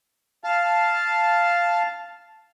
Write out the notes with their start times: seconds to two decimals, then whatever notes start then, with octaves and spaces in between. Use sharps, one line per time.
0.44 F5 A5